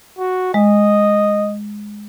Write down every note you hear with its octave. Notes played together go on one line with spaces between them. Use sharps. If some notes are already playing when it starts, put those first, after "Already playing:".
F#4
G#3 D#5